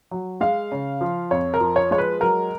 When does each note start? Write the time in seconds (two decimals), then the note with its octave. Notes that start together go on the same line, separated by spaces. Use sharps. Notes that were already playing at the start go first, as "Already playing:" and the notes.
0.11 F#3
0.41 G#3 F5
0.72 C#3
1.01 F3
1.31 F2 C#5
1.54 A#4
1.60 F3
1.76 C#5
1.91 G#3 C#5
1.98 B4
2.20 F#3 A#4